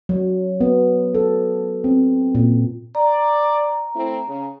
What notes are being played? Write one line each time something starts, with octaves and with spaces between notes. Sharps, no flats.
F#3
B3
A4
C4
A#2
D5 A#5
A3 C4 E4
C#3